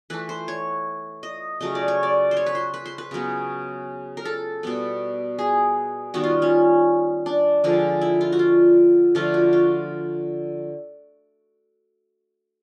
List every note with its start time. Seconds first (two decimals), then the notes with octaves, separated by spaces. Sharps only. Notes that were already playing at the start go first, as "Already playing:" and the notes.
0.10 E3 A3 B4
0.29 C5
0.48 C#5
1.23 D#5
1.61 C#3 F#3 A3 D#5
1.75 D5
1.88 C#5
2.03 D5
2.31 C5
2.37 C#5
2.46 B4
2.55 C5
2.74 B4
2.86 C5
2.98 B4
3.11 C#3 F#3 B3
4.17 A#4
4.25 A4
4.63 B2 G3 B3
5.39 G#4
6.14 D#3 G3 B3 F#4
6.23 F4
6.42 C#4
7.26 D4
7.64 D3 F3 G#3
8.01 E4
8.21 F4
8.32 F#4
8.39 F4
9.15 D3 F3 A3 F4
9.34 F#4
9.53 F4